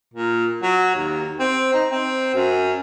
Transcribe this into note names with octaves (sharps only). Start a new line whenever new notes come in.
A#2
F#3
D#2
C4
D#4
C4
F#2